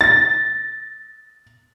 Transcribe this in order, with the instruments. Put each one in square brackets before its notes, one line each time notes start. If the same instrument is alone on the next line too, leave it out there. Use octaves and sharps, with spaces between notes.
[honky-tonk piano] A6 A#6